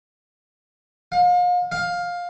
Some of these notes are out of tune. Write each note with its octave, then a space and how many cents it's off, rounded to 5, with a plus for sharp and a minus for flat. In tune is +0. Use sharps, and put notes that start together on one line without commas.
F5 +40
F5 +15